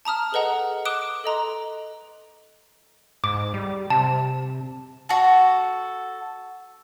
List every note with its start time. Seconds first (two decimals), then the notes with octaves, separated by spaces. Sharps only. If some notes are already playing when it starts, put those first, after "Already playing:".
0.05 A5 A#5 D#6 F6
0.32 G#4 A4 B4 D#5 F#5 A#5
0.85 D6 D#6 F#6 D7 E7 G7
1.24 A4 D#5 A#5 C6
3.24 G#2 D6
3.54 G3
3.90 C3 A5
5.09 F#4 A4